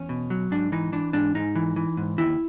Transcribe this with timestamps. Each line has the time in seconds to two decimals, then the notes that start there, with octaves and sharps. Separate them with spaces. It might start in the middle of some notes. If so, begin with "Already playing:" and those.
Already playing: E2 C#4
0.09 B2
0.30 F#3
0.51 G#2 D4
0.72 E3 D#4
0.92 E3 D4
1.13 G#2 D4
1.35 G#2 D#4
1.55 E3
1.76 E3
1.97 G#2
2.18 D#2 E4